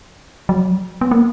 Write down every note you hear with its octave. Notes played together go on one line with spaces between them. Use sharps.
F#3
B3
A#3